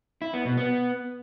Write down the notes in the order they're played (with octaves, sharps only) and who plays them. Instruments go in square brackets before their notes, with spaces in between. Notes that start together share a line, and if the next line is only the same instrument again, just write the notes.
[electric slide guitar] E4
B3
B2
B3